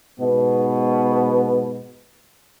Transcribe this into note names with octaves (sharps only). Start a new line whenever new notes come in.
G#2 B2 B3